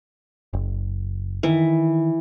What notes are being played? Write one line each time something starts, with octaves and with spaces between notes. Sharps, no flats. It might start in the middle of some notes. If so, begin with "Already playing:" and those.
F#1
D#3 E3